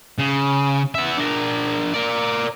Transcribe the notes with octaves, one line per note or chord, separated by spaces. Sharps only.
C#3
B3 E5
D4 A#4
A#4 D5